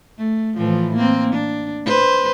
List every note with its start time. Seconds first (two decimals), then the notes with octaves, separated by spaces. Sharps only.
0.18 A3
0.57 A2 E3 F3
0.95 A#3 C4
1.33 D4
1.86 B4 C5